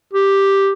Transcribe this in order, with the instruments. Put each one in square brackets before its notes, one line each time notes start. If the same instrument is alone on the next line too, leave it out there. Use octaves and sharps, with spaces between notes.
[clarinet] G4